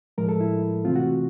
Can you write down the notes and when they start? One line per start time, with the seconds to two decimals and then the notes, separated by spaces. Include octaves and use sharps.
0.18 A2 F3 G#3 A#4
0.29 A4
0.40 E4
0.85 C3 E3 A3 C4 F4
0.96 F#4